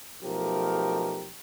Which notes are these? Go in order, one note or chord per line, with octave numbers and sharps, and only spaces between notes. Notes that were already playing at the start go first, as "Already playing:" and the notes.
B1 F3 A3 G4 A#4